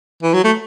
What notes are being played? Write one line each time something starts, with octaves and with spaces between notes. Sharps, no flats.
E3
F#3
A3